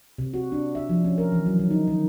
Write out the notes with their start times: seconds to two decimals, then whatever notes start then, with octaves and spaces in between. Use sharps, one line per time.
0.18 C3
0.34 F#4
0.52 D4
0.75 E5
0.89 F3
1.05 C#4
1.18 A#4
1.32 E3
1.46 F#3
1.59 D#3
1.70 D#4
1.88 D#3